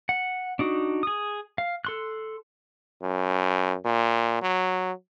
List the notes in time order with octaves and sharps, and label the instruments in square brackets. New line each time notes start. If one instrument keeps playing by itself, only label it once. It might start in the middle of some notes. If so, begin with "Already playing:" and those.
[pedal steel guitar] F#5
D4 D#4 F#4
G#4 D#6
F5
A4 C6 F#6
[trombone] F#2
A#2
F#3